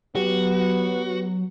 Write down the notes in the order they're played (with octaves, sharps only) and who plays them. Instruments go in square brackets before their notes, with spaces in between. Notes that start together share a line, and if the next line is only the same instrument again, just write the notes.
[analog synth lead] F#3 [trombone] B3 [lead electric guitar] F#4 [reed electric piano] G4